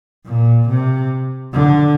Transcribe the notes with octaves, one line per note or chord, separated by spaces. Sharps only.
A#2
C3
D3